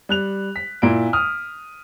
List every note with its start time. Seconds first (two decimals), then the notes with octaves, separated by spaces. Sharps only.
0.09 G3 F#6 F7
0.56 B6
0.82 A#2 E4 D7
1.13 D#6 F6